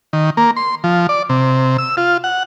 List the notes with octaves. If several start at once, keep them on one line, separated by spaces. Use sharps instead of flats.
D#3
A#3
C6
F3
D5
C3
E6
F4
F#5